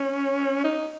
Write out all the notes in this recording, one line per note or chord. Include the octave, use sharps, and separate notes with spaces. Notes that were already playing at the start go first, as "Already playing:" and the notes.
Already playing: C#4
D#4